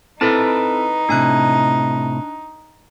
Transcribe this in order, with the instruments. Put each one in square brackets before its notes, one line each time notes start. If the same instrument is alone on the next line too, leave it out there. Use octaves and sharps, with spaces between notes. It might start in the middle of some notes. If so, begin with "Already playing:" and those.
[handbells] C4 E4 A4 [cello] D#4 [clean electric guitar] B4 A5
[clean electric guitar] A2 C3 [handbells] D4 G#5 F#6